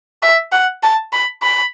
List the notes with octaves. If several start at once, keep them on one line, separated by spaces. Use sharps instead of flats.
E5
F#5
A5
B5
B5